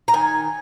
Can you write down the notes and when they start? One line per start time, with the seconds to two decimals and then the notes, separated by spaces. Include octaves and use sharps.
0.08 A#5
0.13 D#3 G#5